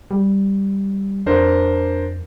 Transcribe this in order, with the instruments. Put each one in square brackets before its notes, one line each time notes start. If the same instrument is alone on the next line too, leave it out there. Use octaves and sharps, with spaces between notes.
[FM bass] G3
[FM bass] F2 [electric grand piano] D4 A#4 C5